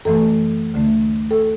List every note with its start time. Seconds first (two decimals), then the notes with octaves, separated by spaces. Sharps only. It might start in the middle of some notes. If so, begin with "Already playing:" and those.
0.05 F#2 E3 A3 A4
0.74 D2 D3 A3
1.31 A4